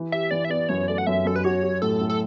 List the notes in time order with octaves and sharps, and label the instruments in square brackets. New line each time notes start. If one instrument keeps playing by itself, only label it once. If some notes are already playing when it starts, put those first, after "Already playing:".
Already playing: [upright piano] E3
[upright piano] G4 [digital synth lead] E5
[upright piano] E3 [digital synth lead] D5
[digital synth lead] E5
[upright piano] B3 [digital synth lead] D5
[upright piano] F#2 [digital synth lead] C#5
[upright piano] A3 [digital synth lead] D5
[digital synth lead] F#5
[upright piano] F#2 [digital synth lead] E5
[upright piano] F#2 [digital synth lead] A4
[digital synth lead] B4
[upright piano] F#4 [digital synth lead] C#5
[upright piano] F#4
[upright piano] A2 [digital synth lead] A4
[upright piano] A2
[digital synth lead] A4